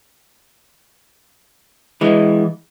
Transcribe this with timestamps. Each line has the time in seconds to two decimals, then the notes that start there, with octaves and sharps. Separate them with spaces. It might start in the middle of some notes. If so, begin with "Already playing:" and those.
2.01 E3 G#3